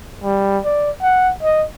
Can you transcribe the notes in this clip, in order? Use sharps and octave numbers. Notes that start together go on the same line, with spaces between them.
G3
D5
F#5
D#5